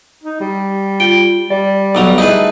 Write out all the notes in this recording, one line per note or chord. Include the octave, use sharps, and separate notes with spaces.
D#4
G3
F4 G5
G3 D5
B1 F#3 A#5
A3 D#4 E4 G#4 A4 B4